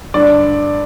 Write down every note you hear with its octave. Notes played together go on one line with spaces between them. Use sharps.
G2 D3 D5